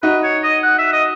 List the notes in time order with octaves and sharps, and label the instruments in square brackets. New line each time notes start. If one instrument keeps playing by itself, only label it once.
[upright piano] D#4 F#4 [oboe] B4
[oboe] C#5
D#5
F#5
E5
D#5